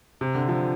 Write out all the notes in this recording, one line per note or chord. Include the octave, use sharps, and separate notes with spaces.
C3
D3
F3